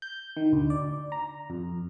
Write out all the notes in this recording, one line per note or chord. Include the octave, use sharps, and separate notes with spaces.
G6
D#3
D2
D5
A#5
F2